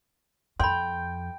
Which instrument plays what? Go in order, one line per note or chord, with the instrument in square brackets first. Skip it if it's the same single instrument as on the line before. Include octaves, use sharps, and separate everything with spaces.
[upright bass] F2 [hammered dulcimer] G5 [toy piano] B5 C6